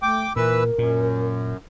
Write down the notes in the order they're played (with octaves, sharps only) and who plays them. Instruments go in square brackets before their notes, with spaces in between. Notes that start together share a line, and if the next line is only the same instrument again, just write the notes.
[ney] A3 [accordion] G5 D6
[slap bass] A#2 [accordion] E3 B4 E6 [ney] A#4
[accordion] F#2 [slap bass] A#2